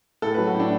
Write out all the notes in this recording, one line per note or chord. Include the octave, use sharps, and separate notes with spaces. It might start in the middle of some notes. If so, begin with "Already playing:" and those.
A2 A4
F#3 B4
F#4
A2
D4